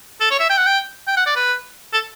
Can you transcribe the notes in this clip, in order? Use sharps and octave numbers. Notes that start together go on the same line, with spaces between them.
A4
C#5
E5
G5
F#5
G5
G5
F#5
D5
B4
A4